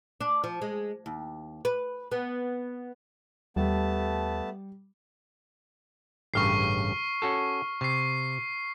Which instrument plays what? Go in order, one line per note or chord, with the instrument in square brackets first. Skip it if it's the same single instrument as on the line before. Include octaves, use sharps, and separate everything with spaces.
[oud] D4
F3
G#3
D#2
B4
B3
[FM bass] D#2 [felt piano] G3 [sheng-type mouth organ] A3 B3 A5
[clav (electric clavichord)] A1 G2 C#3 [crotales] C#6 F6 C7
[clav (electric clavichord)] C#4 F#4 A4
[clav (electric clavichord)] C3 [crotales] C#6 C7